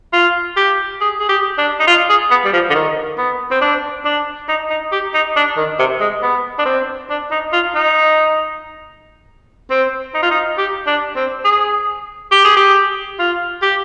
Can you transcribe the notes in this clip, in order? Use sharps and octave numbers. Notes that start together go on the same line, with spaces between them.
F4
G4
G#4
G#4
G4
D4
D#4
F4
G#4
B3
G3
F3
D3
D#3
B3
C4
D4
D4
D#4
D#4
G4
D#4
D4
D#3
C3
G#3
B3
D4
C4
D4
D#4
F4
D#4
C4
D#4
F4
D#4
G4
D4
C4
G#4
G4
G#4
G4
F4
G4